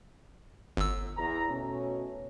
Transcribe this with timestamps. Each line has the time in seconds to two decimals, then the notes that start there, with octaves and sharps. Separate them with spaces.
0.77 G1 E6
1.17 E2 A#5
1.50 B2 A3 C#4